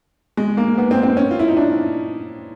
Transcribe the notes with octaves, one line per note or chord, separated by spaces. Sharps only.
G#3
A#3
B3
C4
C4
C#4
F4
E4
D#4
D4